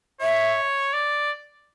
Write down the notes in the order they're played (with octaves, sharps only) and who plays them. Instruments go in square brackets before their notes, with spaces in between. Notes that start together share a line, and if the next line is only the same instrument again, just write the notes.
[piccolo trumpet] C#5 [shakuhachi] E5
[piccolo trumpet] D5